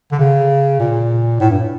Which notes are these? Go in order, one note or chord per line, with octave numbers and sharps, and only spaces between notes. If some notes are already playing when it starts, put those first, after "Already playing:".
D3
C#3
A#2
A2
G2